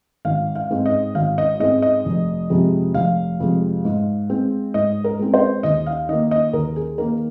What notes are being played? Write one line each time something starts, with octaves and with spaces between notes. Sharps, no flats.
G#1 F5
F5
G#2 G#3 C4
D#5
G#1 F5
D#5
G#2 G#3 C4 D#5
D#5
F1
F2 C3 G#3
F1 F5
F2 C3 G#3
G#2
G#3 C4
G#2 D#5
A#4
G#3 C4
C5
D#2 D#5
F5
D#3 A#3 D#5
D#5
D#2 A#4
G#4
D#3 A#3 A#4